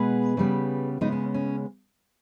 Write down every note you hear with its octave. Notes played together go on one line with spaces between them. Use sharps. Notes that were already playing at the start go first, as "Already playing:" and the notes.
Already playing: B2 G#3 B3 G#4 B4
C#3 G3 B3
C#3 G#3 B3 D#4
C#4
C#4